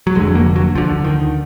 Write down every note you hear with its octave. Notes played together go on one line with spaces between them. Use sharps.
F#3
F1 F2 D3 G#3
A#3
F#3
D2 D3 F3
D#3